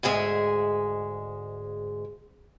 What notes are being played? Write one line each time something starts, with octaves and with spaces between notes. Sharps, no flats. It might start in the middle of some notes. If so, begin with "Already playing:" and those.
D2 G#2 G#3 G#4 E5